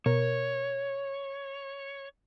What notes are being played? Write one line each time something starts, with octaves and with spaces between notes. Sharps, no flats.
B2 A#4 C#5